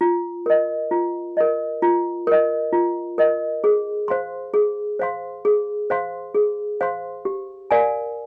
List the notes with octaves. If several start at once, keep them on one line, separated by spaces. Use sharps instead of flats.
F4
A#4 D#5
F4
A#4 D#5
F4
A#4 D#5
F4
A#4 D#5
G#4
C5 F5 C6
G#4
C5 F5 C6
G#4
C5 F5 C6
G#4
C5 F5 C6
G4
A#4 D5 F5 G#5